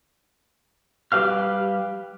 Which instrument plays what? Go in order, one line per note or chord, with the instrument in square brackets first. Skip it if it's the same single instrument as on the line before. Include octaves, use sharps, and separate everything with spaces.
[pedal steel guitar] G3 G4 B4 F5 F6